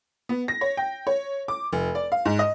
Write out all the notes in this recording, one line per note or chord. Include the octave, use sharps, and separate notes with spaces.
B3
A#6
C#5
G5
C#5
D6
F1
D5
F5
G#2
D#5